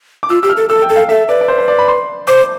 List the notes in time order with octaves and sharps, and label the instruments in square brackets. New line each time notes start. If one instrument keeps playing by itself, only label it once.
[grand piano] D6
[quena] F4 [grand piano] E6
[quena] G4 [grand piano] E6
[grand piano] F6
[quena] A4
[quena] A4 [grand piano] E6
[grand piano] G5
[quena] A4
[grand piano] F5
[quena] A4 [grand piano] E5
[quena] B4 [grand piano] D5
[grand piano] D5
C5
C5
D5
B5
C6
[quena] C5 [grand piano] D6